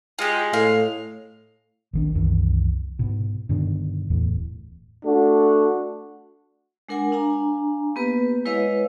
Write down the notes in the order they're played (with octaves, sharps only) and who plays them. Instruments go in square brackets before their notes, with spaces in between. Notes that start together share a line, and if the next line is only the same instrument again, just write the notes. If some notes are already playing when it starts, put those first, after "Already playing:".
[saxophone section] G#3 [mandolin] F4 G4
[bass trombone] A2 [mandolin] F5
[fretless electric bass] A#1 D#3 D4
C2 F#2 D#3 E3
G#2 B2
G2 B2 D3 D#3
D1 E2 A2 E3
[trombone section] A3 D4 F#4
[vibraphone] G#3 D4 A#4 F#5 G#5
D4 F5 G#5 A#5
A#3 B3 G4 B4
G#3 E4 B4 C#5 D#5 F5